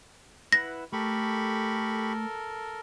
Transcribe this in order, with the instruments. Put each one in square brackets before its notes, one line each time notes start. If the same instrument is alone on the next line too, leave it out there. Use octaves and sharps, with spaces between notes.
[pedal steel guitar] E4 B4 F#5 [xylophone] A#6
[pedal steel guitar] A3 [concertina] G4 B5 C#6 [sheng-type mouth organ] A4 A#4